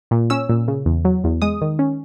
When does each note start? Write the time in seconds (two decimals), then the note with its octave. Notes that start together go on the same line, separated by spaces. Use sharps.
0.11 A#2
0.30 C#4 E6
0.49 A#2
0.68 C#3
0.86 E2
1.05 F#3
1.24 E2
1.42 G#3 D#6
1.61 D#3
1.79 C#4